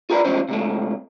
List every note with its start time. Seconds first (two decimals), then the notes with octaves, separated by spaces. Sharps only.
0.10 F4 G#4 A#4 B4 D5 B5
0.25 E2 A2 F3 G#3 C#4 C5
0.48 C3 G#3 A3